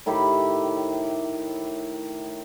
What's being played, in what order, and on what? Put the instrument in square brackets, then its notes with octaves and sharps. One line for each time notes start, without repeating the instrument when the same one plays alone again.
[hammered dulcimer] A2 D#3 E4 G4